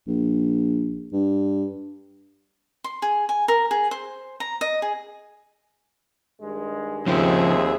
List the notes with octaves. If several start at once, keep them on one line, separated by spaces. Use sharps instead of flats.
A#1
G2
C6
G#4
G#5
A#4
G#4
C5
A#5
D#5
G#4
G2 D#3 G#3
D#2 C#3 F3 C4 G#4 E5